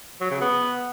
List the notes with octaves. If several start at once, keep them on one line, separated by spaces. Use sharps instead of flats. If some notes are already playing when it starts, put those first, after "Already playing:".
F#3
C#3
B3